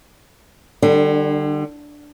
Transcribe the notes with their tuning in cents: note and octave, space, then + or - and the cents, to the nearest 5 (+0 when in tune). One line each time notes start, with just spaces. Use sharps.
D3 +35 G3 +0 D4 +0